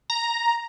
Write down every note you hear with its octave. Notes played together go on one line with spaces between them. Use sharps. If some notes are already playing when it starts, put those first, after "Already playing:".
A#5